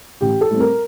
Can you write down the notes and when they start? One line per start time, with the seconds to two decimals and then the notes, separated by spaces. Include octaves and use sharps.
0.21 A1 G4
0.41 A4
0.50 A2 G3 C4
0.60 A#4